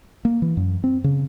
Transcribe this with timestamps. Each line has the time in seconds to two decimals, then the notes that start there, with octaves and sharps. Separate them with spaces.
0.25 A#3
0.42 E3
0.57 F#2
0.84 C4
1.04 C#3